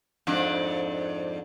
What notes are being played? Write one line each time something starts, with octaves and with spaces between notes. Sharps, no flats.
F2 G#2 D4